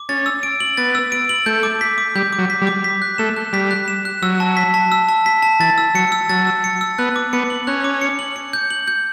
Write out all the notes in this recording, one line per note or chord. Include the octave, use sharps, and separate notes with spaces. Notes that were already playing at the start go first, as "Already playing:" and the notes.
Already playing: D6
C#4 A6
E6
D7
F#7
B3 A6
E6
D7
F#7
A3 G6
D6
B6
D6
G3 G6
D6
F#3
B6
G3
D6
B6
F#6
A3 E7
F#6
G3 B6
F#6
E7
F#6
F#3 E6
A5
B6
A5
E6
A5
B6
A5
E3 A6
E6
F#3 C#7
E6
F#3 A6
E6
C#7
E6
B3 F#6
D6
B3 C#7
F#7
C#4 F#6
D6
C#7
F#7
C#7
G6
F#7
G6